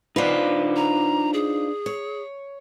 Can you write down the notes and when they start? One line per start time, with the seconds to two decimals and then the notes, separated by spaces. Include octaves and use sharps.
0.16 D4 D#4 F4 B4 C5
0.76 A#5
1.34 G#4
1.86 C#5